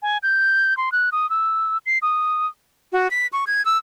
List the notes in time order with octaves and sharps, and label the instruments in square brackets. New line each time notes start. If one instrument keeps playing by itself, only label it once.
[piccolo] G#5
G6
C6
F#6
D#6
E6
C7
D#6
[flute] F#4
B6
C#6
G#6
E6